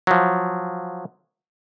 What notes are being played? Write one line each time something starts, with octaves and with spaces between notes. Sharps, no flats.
F3 F#3